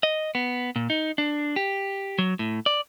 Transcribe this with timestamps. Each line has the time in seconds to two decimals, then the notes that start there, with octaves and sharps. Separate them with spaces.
0.03 D#5
0.35 B3
0.76 A#2
0.90 D#4
1.18 D4
1.56 G4
2.18 F#3
2.39 A2
2.66 D5